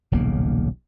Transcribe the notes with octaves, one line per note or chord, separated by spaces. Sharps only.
D#1 B1 C#3 A#3